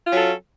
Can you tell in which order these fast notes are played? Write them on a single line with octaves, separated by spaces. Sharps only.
F4 F#3 C#4 A4